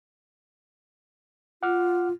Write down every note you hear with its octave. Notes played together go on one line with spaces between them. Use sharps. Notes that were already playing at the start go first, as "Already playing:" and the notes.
F4 F#5 D6 F6